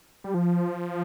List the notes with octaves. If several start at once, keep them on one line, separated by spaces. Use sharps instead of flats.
G3
F3